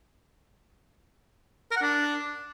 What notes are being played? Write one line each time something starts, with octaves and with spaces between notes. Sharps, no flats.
A#4
F#5
D4